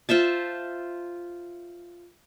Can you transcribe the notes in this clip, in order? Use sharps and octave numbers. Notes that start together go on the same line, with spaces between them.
F4 C5 E5 A5